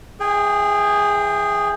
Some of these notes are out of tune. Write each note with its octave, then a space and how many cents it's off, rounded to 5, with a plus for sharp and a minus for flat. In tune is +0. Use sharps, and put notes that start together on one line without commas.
E3 +0 G#4 -10 G5 +20